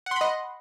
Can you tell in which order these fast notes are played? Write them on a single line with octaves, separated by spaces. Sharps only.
F#5 C6 B5 D#5